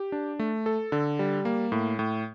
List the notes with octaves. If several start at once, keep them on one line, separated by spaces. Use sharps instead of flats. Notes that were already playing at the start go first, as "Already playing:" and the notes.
Already playing: G4
D4
A3
A4
D3
G3
A#3
A2
A2